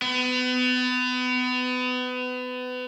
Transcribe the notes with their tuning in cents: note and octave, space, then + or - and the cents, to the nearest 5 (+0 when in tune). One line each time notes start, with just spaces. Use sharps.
B3 +30